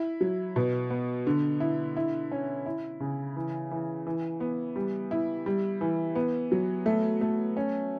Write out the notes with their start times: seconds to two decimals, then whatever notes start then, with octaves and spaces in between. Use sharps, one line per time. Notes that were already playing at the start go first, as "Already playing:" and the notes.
Already playing: E4
0.21 F#3
0.56 B2
0.90 B3
1.27 D3
1.60 E4
1.97 E4
2.31 C#4
2.66 E4
3.00 C#3
3.36 E3
3.71 E3
4.07 E3
4.40 B3
4.76 G3
5.11 E4
5.46 G3
5.81 E3
6.15 B3
6.52 F#3
6.86 A3
7.21 A3
7.57 C#4